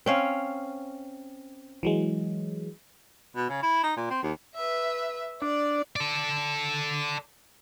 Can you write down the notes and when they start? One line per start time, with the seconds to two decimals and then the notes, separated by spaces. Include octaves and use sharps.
0.06 C4 C#4 F5
1.83 E3 F#3 G#3
3.36 B2
3.49 C#3
3.63 E4
3.83 D#4
3.96 A#2
4.11 C4
4.23 D#2
4.55 B4 E5
5.42 D4 D5
5.96 A4 D5